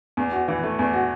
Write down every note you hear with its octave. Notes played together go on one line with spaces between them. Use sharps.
E2
F#4
E3
A3
E2
F#4